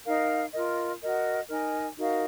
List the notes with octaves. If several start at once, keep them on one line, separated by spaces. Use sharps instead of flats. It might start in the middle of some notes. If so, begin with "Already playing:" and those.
D#4 A#4 F5
F4 A#4 D#5
F#4 A#4 D#5
D#4 A#4 D#5 G#5
D#4 F#4 A#4 F5